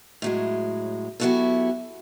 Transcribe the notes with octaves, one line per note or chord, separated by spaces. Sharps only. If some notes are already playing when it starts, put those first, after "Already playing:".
A2 F#3 G#3
F#3 B3 E4 F#4 G4 A4